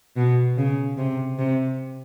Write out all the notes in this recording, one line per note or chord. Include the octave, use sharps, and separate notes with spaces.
B2
C#3
C3
C3